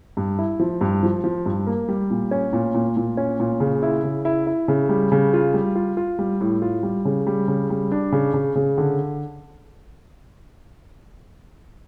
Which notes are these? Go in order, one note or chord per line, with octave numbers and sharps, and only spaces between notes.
G2
E4
F3
G2
F3
F3
G2
A#3
G3
A#2
C#4
A#2
A#2
A#2
C#4
A#2
C#3
E4
C#3
E4
E4
C#3
G3
C#3
F4
G3
F4
F4
G3
A2
F4
G3
C#3
G3
C#3
G3
D4
C#3
C#3
C#3
D3